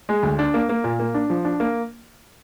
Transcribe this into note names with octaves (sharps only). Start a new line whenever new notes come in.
G#3
D2
D4
A#3
A#3
A#2
A#3
D4
F3
D4
A#3